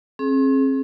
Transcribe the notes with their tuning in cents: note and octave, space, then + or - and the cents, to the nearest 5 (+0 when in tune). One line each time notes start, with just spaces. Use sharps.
C4 +45 G#4 +35